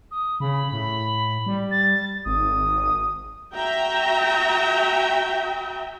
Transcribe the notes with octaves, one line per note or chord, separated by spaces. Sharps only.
D#6
C#3 B5
A2
G3
A6
G#1 D#6
F#4 E5 G5 A#5